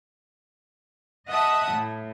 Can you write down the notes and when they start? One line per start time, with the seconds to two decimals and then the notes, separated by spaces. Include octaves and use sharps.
1.29 D#5 E5 F#5 A5 D#6
1.73 A2